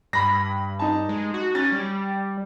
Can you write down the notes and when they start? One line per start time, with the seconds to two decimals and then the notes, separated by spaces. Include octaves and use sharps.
0.13 G2 B5 A#6
0.79 D#4 A5
1.09 G#3
1.34 F#4
1.55 C#4 A6
1.72 G3